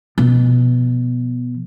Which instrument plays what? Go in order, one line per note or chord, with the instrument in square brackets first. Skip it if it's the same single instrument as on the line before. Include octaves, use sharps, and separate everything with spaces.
[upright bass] B2 F3